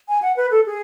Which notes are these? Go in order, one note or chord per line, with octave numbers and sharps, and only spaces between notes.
G#5
F#5
B4
A4
G#4